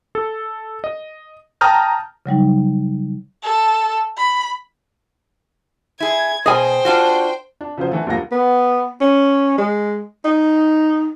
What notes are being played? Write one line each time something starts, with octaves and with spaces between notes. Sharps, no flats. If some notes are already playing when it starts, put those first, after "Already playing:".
A4
D#5
G5 A5 A#5 D#6 F6 G6
C#3 F#3 G3 D#4
A4
B5
E4 G#4 G#6
B2 G#4 C5 D#5 G5 G#5
D4 F4 F#4
D4
C#3 F3 F#3 F#4 C5
D3 E3 A3
D2 G2 D3 F3 A#3 A#6
B3
C#4
G#3
D#4